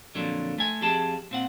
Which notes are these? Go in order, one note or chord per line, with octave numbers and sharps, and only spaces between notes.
F2 A#2 D3 F#3
A3 G#5
F2 G4 G#4 A5
A#2 C4 F#5